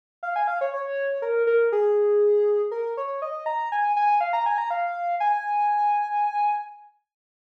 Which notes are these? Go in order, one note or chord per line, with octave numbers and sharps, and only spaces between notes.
F5
G#5
F5
C#5
C#5
A#4
A#4
G#4
A#4
C#5
D#5
A#5
G#5
G#5
F5
A#5
G#5
A#5
F5
G#5